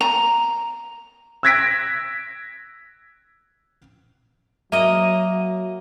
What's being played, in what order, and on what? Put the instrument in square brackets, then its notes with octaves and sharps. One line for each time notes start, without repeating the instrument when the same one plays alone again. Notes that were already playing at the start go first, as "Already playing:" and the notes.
[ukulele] A#5
[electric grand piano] E6 F#6 G#6 A#6 B6 D7
[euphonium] F#3 [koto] A#3 D#5 [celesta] E5